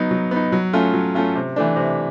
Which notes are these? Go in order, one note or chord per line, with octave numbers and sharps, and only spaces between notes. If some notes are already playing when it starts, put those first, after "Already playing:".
Already playing: F#3 B3 D#4
F#3
B3 D#4
F#3
A3 C#4 F4
F#3
A3 C#4 F4
C3
E3 A3 D4
C3